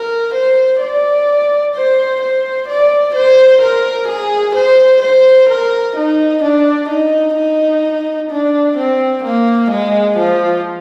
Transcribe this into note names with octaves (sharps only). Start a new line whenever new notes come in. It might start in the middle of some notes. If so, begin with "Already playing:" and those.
Already playing: A#4
C5
D5
C5
C5
D5
C5
A#4
G#4
C5
C5
A#4
D#4
D4
D#4
D#4
D4
C4
A#3
G#3
F3